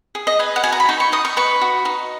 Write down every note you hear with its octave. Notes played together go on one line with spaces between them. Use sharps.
G#4
D#5
B4 G#5
F#5
F#4 G#5
A#5
B5
D#4 C#6
C#6
D#4 D#6
C#6
B4 C#6
F#4
D#4